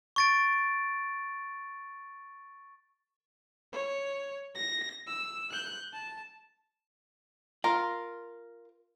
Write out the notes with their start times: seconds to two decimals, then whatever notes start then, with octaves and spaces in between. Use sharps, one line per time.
0.16 C#6 A6 D7
3.73 C#5
4.55 A#6
5.07 E6
5.52 F#6 G6
5.93 A5
7.64 F4 A#4